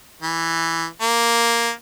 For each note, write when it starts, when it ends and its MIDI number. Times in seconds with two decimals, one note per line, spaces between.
0.23 0.86 52
1.01 1.71 58